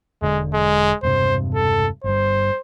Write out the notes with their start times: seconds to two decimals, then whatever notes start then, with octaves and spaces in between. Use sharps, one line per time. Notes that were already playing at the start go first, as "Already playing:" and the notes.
0.22 E1 D3 G#3
0.54 G#3
1.03 E1 G2 C3 C5
1.55 A4
2.04 G1 G2 C5